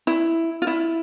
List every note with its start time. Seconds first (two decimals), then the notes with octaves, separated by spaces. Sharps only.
0.07 E4
0.62 F4
0.67 E4